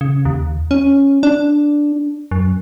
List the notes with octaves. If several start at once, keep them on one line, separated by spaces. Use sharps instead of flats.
C#3
D#2
C#4
D4
F#2